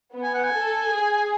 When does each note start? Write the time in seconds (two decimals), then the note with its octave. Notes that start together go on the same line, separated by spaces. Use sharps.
0.13 B3
0.23 G#5
0.34 F#5
0.44 G#5
0.52 A4
0.91 G#4